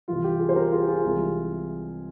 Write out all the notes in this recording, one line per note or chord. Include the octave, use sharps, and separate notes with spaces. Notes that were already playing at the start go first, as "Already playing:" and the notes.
C2 C3 E3 G3 F4
G4
F4 G#4
C5
G4 A#4
F4 G#4
F4 G#4
C2 C3 E3 G#3